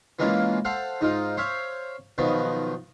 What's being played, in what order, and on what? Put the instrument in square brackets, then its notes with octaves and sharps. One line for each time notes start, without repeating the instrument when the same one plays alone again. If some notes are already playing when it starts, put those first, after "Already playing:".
[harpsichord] E3 G#3 A#3 C#4 E4 F4
A4 C5 F5 F#5
G#2 D#4 F4
C5 C#5 E5 F5
B1 B2 D#3 F3 B3